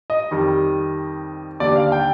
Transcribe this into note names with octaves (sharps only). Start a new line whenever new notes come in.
D#5
F2 D#3 G3
D#2 D3 G3 D5
F5
G5